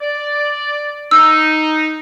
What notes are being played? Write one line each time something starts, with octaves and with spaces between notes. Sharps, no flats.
D5
D#4 E6